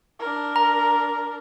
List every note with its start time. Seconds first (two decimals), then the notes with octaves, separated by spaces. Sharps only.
0.19 D4 A#4
0.56 A#5